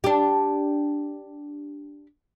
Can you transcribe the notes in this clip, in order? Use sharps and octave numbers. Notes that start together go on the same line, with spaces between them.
D4 G4